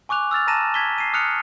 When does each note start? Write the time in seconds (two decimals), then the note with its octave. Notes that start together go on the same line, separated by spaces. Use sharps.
0.09 G#5 C#6 D6 F#6 F7
0.31 E6 F6 A6 F7
0.47 A5 A#5 A#6 D#7 E7
0.74 G#6 B6 G7
0.98 C7 D#7
1.13 D#6 F6 F#6 C#7 F7